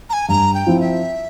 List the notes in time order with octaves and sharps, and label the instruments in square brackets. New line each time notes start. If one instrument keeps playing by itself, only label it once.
[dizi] A#5
G#5
[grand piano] G2 [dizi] A#5
[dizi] G5
[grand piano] F3 C4 E4
[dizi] E5